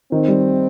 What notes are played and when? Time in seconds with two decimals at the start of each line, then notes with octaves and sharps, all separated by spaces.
0.12 D#3 C4
0.28 G3